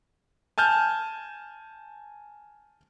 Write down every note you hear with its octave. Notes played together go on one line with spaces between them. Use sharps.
G#5 A5 F6 G6